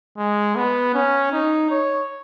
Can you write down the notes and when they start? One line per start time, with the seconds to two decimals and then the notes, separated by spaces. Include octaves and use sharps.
0.18 G#3
0.55 B3
0.94 C#4
1.32 D#4
1.70 C#5